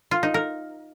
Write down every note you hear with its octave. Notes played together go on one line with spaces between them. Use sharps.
F4
D#4
A#4